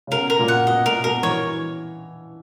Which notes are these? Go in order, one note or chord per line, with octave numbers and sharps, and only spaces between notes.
C#3
B2 A#4
A#4
A#2
F#5
B2 D#5
A#2 A#4
B2 A#4
E3 C#5